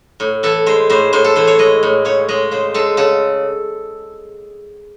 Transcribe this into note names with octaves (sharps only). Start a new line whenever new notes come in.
A2
E3 A4
G#3 C5
A2 C5
A2 C5
A4
E3 C5
C#5
G#3 D#5
A2
C#3 C#5
G#3 D#5
C#3 C5
G#3 A4
C#3 A4